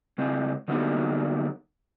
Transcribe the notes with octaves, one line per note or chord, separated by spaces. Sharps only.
C#3 G#3 C4
D3 F#3 G3 A#3 B3 D#4